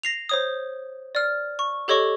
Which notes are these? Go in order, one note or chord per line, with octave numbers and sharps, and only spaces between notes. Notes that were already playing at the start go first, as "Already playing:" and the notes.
A#6 C7 F7
C5 C#5 D#6
D5 F6
C#6
G4 A4 C#5 D#5 C#6